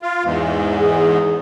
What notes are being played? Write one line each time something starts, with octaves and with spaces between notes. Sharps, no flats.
F4
E2 G#2
G#4